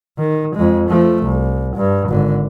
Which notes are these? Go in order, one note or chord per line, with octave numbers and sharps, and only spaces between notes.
D#3
F2 G#3
F3 A3
C2
G2
G#1 D3